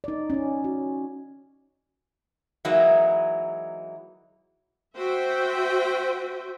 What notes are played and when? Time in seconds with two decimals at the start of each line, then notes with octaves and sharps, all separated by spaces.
0.04 D#4 D5
0.30 C#4 D#4
0.64 F#4
2.65 E3 F#3 G#3 A#3 D#4 E4
4.97 F#4 C5 E5 G5